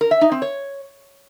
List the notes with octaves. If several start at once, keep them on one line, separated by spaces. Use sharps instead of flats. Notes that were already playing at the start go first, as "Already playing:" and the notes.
A#4
E5
D#4
C4
C#5